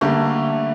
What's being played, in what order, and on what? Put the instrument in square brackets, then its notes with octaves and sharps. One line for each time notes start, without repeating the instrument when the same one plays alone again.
[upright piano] D3 G3 A#3 [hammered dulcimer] A3